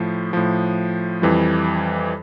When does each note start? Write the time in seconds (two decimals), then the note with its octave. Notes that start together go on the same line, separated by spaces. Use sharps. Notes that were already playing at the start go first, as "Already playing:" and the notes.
Already playing: A2 F3
0.33 A2 F3
1.22 F2 E3 G3